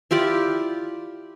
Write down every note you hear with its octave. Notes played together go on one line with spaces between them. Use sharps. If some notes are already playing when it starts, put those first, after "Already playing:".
E4 F4 G4 D5